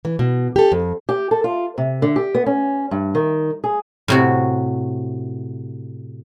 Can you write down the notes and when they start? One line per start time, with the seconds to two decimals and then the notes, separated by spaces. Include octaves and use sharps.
0.05 E3
0.19 B2
0.56 G4 A4
0.72 F2
1.09 G4
1.31 A4
1.44 F4
1.78 C3
2.02 D3
2.16 G4
2.35 B3
2.46 C#4
2.91 G2
3.15 D#3
3.64 G#4
4.08 A2 C3 F#4